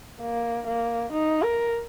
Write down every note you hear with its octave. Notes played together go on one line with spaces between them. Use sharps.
A#3
A#3
D#4
A#4